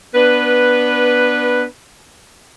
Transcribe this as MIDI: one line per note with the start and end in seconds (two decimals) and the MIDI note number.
0.15 1.64 59
0.15 1.64 62
0.15 1.64 71